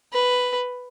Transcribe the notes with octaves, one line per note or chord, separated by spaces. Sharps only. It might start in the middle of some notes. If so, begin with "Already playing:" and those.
B4